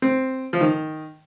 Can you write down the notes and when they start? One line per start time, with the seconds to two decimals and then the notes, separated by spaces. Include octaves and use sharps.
0.02 C4
0.53 F3
0.61 D#3